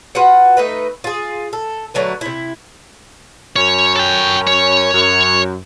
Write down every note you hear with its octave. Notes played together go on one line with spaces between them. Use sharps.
F4 F#4 B4 F#5
A3 D#4 B4
F4 G#4
A4
D3 F#3 A3 B4
C3 E4
F#2 C#4 C#5
A4 G5
C#5
F#2